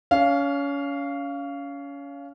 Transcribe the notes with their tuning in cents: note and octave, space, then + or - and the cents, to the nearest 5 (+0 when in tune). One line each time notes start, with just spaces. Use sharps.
C#4 +30 F5 -10